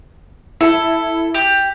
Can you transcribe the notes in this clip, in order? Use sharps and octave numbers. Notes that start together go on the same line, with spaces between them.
E4 A4
G4